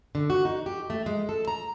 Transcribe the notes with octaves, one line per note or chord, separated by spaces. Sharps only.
D3
F#4
D#4
G4
A3
G#3
A4
A#5